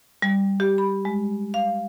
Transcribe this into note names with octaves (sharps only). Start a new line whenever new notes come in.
G3
G4
B5
G#3
F5